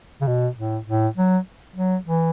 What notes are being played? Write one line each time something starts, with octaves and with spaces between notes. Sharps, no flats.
C#3
B2
A2
A2
F#3
F#3
E3